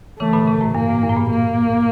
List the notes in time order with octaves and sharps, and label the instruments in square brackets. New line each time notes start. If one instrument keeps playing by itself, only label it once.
[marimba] C#3 E3 [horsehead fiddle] A3
[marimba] A#2 D3
C#3
A2
[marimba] G2 [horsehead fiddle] A#3
[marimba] A2
G2
A2
A#2
[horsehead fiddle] A#3